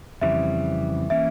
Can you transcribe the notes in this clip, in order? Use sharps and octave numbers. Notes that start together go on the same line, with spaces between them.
F2 C#3 E3 G3 C4 E5
E3 A#3 C#4 E4 E5